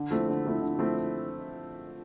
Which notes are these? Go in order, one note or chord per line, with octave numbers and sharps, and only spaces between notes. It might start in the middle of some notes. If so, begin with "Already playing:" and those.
Already playing: D3
F3 A3 C4 E4
D3
F3 A3 C4 E4
D3
F3 A3 C4 E4